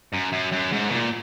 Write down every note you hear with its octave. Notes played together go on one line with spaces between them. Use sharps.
F#2
F#2
F#2
G#2
B2
A#2